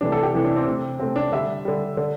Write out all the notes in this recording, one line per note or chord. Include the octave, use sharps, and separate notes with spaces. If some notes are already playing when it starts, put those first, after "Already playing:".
C3 E3 A3 D4
A4
G4
C3 E3 A3 E4
D4
C4
C3 A3
C3 A3 C4
D4
D3 G3 E5
D3 G3
D3